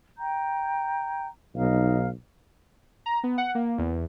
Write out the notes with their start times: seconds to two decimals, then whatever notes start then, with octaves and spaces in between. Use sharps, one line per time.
0.18 G5 A#5 G6
1.55 B1 D#4 F5
3.06 A#5
3.24 B3
3.38 F#5
3.55 A#3
3.78 E2